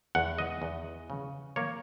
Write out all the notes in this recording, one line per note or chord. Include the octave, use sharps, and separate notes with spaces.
E2 F#5
D#5
E2
C#3
A#3 C#5